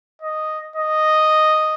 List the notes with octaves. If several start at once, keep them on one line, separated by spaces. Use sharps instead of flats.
D#5
D#5